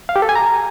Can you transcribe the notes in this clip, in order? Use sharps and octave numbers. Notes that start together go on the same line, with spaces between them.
F5
G4
A4
G#5
A#5